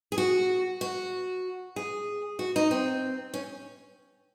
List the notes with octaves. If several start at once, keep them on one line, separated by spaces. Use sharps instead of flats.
G#4
F#4
F#4
G#4
F#4
D#4
C4
C#4